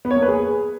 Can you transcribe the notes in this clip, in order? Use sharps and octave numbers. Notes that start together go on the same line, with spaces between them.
B3
C#5
A#3
B4
G#4